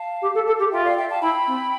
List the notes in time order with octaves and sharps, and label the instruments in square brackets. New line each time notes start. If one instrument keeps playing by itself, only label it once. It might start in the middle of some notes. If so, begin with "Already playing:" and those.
Already playing: [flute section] F5 A5
[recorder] G4
A4
A4
G4
[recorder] F4 [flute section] E5 G5
[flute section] D5 F5
E5 G5
F5 A5
[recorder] E4 [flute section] G5 B5
[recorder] C4